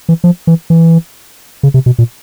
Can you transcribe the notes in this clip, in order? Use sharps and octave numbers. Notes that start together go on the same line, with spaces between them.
E3
F3
E3
E3
C#3
C3
B2
A#2